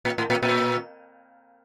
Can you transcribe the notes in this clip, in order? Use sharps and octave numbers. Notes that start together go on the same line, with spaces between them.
A#2
A2
A#2
A#2